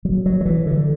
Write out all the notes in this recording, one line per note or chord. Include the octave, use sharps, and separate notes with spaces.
F#3
F#3
F#3
E3
D3